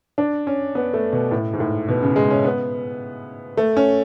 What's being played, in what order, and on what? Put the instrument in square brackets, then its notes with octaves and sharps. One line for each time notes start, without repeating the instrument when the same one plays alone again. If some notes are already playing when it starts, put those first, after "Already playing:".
[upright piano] D4
C#4
B3
A3
B2
A2
G#2
A2
B2
C#3
G#3
C#4
B3
A3
C#4